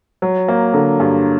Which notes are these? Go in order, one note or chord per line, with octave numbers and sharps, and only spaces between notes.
F#3
A#3
D3
G2